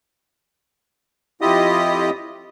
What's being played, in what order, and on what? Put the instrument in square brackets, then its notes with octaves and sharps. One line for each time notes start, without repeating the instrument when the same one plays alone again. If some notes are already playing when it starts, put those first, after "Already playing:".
[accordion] F2 E4 F4 G4 D#5 D#6